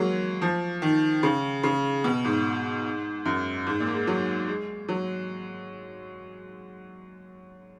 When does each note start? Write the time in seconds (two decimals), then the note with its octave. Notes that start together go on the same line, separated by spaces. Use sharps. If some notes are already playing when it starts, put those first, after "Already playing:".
Already playing: F#3 G#3 A#3
0.42 F3
0.82 D#3
1.23 C#3
1.63 C#3
2.04 B2
2.25 G#2
3.25 F#2
3.67 G#2
3.80 A#2
3.87 A#3
3.94 G#3
4.07 F#3
4.48 G#3
4.88 F#3